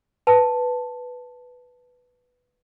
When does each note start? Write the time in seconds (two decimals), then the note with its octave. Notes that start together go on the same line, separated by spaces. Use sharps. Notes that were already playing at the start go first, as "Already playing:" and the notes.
0.27 B4 A5